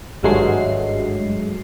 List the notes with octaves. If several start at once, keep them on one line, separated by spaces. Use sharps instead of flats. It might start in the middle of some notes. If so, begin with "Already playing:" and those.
G#1 G2 F#3 G#3 A3 C7